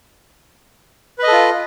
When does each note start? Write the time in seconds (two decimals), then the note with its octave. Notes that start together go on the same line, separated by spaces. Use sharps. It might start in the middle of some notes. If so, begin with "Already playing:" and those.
1.19 B4
1.23 D#5
1.28 A4
1.32 F4